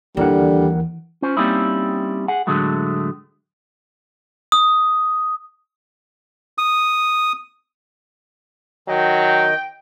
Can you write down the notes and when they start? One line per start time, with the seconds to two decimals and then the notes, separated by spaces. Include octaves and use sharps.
0.17 D#2 D3 E3 G3 A#4 F#5
1.22 C#4 F4 C5
1.37 G3 A#3 C4 C#4 D#4 E4
2.28 G#4 F#5
2.47 A2 D3 F#3 G#3 A3
4.52 D#6
6.58 D#6
8.88 D#3 F#3 D#5 G5